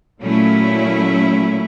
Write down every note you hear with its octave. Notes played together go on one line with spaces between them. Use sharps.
A#2 F#3 A3 C#4 E4